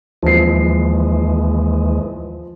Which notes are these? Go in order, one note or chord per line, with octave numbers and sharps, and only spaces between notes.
D#2 E3 F3 G#3 C7